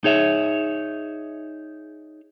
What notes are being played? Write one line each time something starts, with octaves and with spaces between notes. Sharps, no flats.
D#4 G#4 C#5 E5